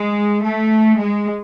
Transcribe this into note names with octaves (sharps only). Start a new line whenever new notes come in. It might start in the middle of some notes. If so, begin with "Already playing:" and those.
Already playing: G#3
A3
G#3